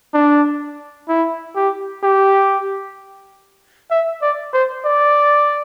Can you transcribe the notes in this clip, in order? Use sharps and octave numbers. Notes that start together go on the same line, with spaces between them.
D4
E4
G4
G4
E5
D5
C5
D5